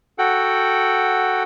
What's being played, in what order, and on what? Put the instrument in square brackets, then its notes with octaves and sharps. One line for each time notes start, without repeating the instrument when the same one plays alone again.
[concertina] F#4 A4 F#5 G5